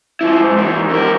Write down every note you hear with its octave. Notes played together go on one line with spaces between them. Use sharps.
F3 E4
G#2
E2 D#3
F2 A#4